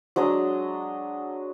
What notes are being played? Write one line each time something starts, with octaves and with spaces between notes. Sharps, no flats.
F#3 G#3 D4 D#5